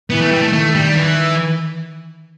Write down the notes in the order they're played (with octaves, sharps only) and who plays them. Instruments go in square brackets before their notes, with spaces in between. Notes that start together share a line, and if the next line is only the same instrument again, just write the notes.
[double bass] E3 [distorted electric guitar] B3
[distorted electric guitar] A3
G3
A3
[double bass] D#3 [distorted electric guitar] A3
[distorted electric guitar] G3
E3